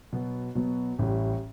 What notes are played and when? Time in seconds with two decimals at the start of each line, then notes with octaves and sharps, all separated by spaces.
0.13 B2 F#3 B3
0.55 B2 F#3 B3
0.99 A1 A2 G3